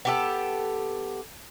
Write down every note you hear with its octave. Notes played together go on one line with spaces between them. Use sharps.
B3 G4 A4